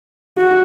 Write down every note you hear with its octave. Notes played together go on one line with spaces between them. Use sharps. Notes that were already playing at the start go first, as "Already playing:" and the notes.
F#4